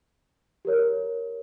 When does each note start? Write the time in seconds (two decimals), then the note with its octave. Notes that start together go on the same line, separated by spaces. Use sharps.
0.65 G4 A#4 C#5